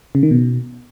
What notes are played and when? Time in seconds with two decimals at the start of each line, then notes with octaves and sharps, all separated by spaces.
0.15 C#3
0.23 D#3
0.31 B2